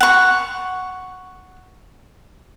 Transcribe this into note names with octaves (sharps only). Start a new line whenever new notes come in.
F#5 C#6